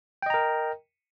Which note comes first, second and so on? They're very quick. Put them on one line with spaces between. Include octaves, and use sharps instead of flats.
G5 D#5 A#5 A#4